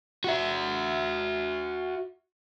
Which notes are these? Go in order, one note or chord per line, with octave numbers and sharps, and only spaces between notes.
F#4 E5